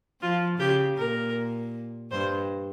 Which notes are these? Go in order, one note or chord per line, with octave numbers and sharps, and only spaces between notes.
F3 F4
C#3 G4
A#2 A#4
G2 C5